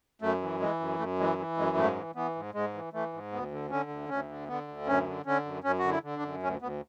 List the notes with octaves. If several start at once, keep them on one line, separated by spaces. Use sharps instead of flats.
F#2 A3
E3
E3 G#3
F#2
F#2 A3
E3 G#3
E3
F#2 G#3
G#2 A3
E3
E3 B3
G#2
G#2 G#3
E3
E3 A3
G#2
D2 B3
D3
D3 C#4
D2
D2 C#4
D3
D3 B3
D2
F#2 C#4
D3
D3 C#4
F#2
F#2 C#4
F#4
D3
E4
D3
D4
F#2
D2 C#4
D2 B3